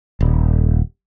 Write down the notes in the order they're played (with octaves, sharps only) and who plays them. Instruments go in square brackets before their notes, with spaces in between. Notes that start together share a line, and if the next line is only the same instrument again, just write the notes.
[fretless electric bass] D#1